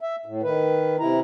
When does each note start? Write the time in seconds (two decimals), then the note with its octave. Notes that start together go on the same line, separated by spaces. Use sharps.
0.01 E5
0.26 A2
0.43 D#3 B4
1.00 C3 E4 A#5